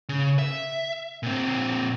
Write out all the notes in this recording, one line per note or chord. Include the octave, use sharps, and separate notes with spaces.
C#3
E5
A#2 C4